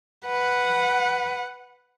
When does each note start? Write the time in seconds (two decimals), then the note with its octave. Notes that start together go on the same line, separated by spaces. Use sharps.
0.26 B4 F#5